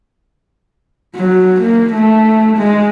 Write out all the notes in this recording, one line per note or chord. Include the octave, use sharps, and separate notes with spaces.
F#3
A#3
A3
G#3